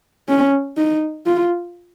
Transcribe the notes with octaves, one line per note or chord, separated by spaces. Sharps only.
C#4
D#4
F4